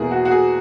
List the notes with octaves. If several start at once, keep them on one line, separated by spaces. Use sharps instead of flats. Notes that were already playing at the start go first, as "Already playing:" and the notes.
Already playing: E2 B2 A#3 E4 G#4
F#4
F#4
G#4